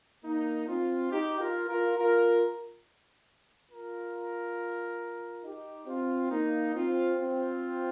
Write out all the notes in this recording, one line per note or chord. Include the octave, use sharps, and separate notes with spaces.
A#3 D#4
C4 F4
D#4 G4
F4 A#4
F4 A#4
F4 A#4
F4 A#4
D#4 G4
C4 F4
A#3 D#4
C4 F4
C4 F4